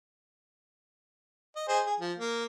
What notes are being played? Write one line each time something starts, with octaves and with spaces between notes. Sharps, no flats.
D#5
G#4 C5 D#5
G#4
F3
A#3